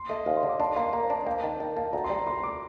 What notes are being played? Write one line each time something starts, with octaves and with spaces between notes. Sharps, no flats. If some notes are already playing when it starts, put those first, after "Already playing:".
Already playing: C6
A3 D#5
D#2 F5
C6
D3
D6
D4 C6
A#3 C6
A#3 A#5
C5
D4
D#5
A#3 G5
D#3 A5
D#3 A5
A#3 A5
D2 A#5
C6
G3
A#5
D2 C6
D6